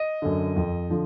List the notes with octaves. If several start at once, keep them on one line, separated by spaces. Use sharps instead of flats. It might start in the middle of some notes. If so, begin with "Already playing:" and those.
Already playing: D#5
F#2 D3
F2
D3 F3